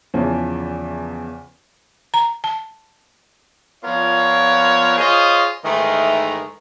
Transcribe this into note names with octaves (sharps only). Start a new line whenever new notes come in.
E2 C#3 E3 F3
A#5
A5
F3 B3 F4 A#4 C#5 D5
F4 G#4 C5 C#5 D#5 F5
G#2 D#3 E3 A3 A#4 D#5